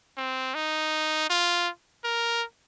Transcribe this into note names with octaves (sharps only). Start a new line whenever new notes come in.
C4
D#4
F4
A#4